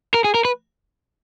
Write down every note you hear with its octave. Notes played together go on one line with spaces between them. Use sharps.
A#4
G#4
A#4
B4